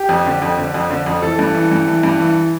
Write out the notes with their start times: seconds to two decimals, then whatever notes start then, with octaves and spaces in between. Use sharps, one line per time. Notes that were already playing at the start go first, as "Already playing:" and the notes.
Already playing: G4
0.09 F2
0.26 D3
0.42 F2
0.58 D3
0.74 F2
0.90 D3
1.06 F2
1.22 E3 A4
1.39 G2
1.55 E3
1.71 G2
1.88 E3
2.03 G2
2.20 E3